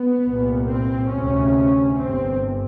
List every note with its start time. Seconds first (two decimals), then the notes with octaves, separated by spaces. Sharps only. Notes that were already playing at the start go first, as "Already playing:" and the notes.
Already playing: B3
0.23 C2 A#2
0.67 C4
1.10 D2 C3 C#4
1.97 G1 G2 C4